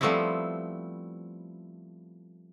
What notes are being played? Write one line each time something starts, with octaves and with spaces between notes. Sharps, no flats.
F3 G3 A3 B3 C4 E4